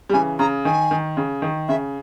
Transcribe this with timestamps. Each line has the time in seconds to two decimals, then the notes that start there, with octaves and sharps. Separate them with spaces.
0.09 G3
0.13 C#3 E3 G#5
0.39 C#3 A#5
0.65 D#3 G#5
0.91 D#3
1.17 C#3
1.42 D#3
1.68 C#3 E5